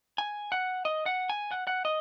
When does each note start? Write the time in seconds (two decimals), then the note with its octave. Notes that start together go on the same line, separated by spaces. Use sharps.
0.18 G#5
0.52 F#5
0.85 D#5
1.06 F#5
1.29 G#5
1.51 F#5
1.67 F#5
1.85 D#5